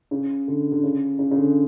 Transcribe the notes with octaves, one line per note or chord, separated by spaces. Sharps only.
C#3
D3
D3
C#3
C#3
C#3
D3